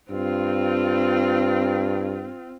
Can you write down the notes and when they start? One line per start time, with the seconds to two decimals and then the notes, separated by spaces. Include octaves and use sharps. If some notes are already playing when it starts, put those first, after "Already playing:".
0.11 G2 C4 F4